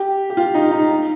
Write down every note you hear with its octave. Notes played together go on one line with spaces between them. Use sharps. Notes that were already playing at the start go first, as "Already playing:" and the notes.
Already playing: G4
G4
F4
D#4
D#4
D#4